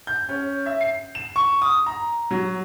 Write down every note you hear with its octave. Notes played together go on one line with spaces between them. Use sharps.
G6
C#4
E5
C7
E7
C#6
D#6
A#5
F#3